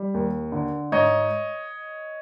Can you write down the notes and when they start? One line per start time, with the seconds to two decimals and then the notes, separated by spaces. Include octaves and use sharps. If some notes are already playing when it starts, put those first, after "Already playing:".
Already playing: G3
0.14 D#2
0.52 D3
0.92 G#2 C#5 D#5